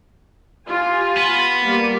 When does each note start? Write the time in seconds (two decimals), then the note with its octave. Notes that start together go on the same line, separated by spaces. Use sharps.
0.68 F4 G4 G#5
1.17 B3
1.61 G3 A#3 F4